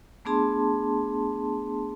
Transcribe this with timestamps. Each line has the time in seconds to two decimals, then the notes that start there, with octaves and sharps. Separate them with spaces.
0.25 A3 B3 D4 G#4 A5 C6